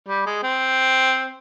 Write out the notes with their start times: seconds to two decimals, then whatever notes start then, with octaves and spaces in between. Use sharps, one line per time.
0.08 G3
0.26 G#3
0.43 C4